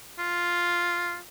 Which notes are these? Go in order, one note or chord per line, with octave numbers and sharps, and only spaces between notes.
F4